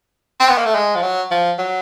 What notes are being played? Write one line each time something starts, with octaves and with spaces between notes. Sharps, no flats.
C4
B3
A#3
A3
G#3
F3
F#3
F3
F#3